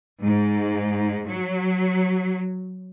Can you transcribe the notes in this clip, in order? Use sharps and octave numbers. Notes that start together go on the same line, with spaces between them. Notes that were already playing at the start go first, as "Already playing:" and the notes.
G#2
F#3